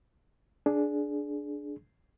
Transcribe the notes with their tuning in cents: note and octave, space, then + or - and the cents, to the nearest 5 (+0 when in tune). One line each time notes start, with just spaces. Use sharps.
D4 +0 G#4 +20